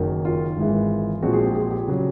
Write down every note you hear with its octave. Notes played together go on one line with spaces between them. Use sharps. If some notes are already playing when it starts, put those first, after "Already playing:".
Already playing: F#1 F#2 D#3 F#3
F4
G#1 G#2 E3 G#3
A#1 A#2 F3 G#3 C4 F#4
G#4
G4
G#4
G4
C#3 F#3